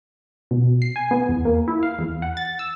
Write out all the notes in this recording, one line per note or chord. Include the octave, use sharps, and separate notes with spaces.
B2
C7
G#5
B3
E2
A#3
E4
F5
E2
F#5
A6
E6